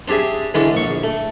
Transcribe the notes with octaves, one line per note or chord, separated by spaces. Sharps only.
C4 D4 G4 G#4 E5
D3 E3 G#3 C#4 D4
A#1 C#6
A3